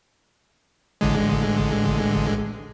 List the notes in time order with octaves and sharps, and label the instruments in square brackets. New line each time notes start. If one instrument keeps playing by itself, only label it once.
[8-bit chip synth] A1 D3 G#3